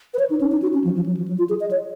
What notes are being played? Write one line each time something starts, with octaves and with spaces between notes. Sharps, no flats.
B4
C#5
D#4
C#4
D#4
F#4
C#4
F3
F3
F#3
F3
F#3
F4
G#4
D#5
C#5